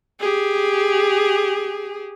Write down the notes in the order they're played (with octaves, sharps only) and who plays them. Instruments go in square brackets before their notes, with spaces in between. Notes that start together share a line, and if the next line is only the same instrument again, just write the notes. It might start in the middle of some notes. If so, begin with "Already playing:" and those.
[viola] G4 G#4